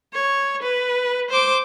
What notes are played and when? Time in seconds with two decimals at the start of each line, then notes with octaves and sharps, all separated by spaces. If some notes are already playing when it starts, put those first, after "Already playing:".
0.13 C#5
0.62 B4
1.30 C5 D6